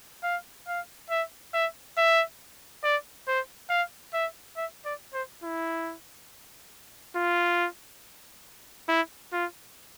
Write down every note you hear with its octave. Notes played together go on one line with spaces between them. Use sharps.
F5
F5
E5
E5
E5
D5
C5
F5
E5
E5
D5
C5
E4
F4
E4
F4